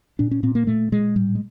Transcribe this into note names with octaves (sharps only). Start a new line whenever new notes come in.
A#2 D4
C#4
A#2 C4
A#3
A#2 A3
A#2 G#3
A2 G3
G#3